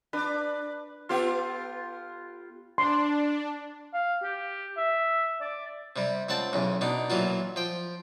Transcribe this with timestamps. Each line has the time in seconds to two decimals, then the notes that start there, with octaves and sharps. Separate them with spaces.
0.13 D4 B4
1.09 B3 F4 G4 A4
2.78 D4 C6
3.94 F5
4.23 G4
4.77 E5
5.41 D5
5.96 C3 G3
6.29 C#2 C4 F#5 A5
6.53 B1 E2 C#3
6.81 B2 D4 D#4
7.10 A#2 E3 F#3 F4 F#4
7.56 F3 G5